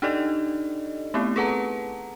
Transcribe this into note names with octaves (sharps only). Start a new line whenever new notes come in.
D4 D#4 G4 A4 D5 D#5
A3 B3 C4 E4 G4
G#4 A4 B4 F#5 A5 A#5